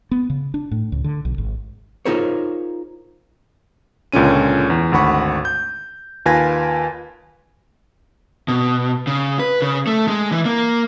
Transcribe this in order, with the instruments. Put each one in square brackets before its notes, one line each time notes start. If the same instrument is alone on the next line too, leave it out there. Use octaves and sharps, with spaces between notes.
[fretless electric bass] B3
C#3
D4
A2
C#2
D3
B1
G#1
[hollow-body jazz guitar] D#4 F4 G#4 A#4 C5 C#5
[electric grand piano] C#2 A#2 D3 C#4 D#7
E2
G#1 D2 F#5 B5 C#6
G6
D#2 F4 B4 G#5 G#6 A#6
[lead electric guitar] B2
C#3
B4
C#3
A3
G#3
E3
A#3